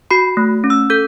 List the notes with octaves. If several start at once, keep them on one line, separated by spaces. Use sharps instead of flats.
F#4 B5
A3
C#4
E6
A4 G6